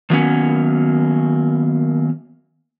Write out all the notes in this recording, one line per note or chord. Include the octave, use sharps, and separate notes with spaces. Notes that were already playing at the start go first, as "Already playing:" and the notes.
D#3 F#3 A#3 B3 C#4